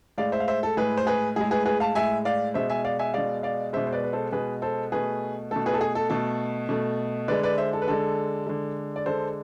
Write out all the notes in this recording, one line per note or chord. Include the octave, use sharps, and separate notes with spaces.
A2 G#3 D5 F5
C5 E5
F5
C5 E5
A4
A2 G#3 G#4 B4
C5
G#4 B4
A2 G#3 G#4
G#4 B4
G#4 B4
F5 A5
A2 G#3 E5 G#5
D5 F5
B2 G#3 C5 E5
E5 G#5
D5 F5
E5 G#5
B2 G#3 D5 F5
D5 F5
B2 G#3 C5 E5
C5
B4 D5
B4
A4 C5
B2 G#3 G#4 B4
A4 C5
B2 A3 G#4 B4
B2 A3 A4
G#4 B4
A4
G#4
A4
B2 A3 A4
B2 A3
D3 G#3 B4 D5
B4 D5
C5 E5
A4
B4
D3 G#3 A4
D3 G#3
D5
D3 G#3 A4 C5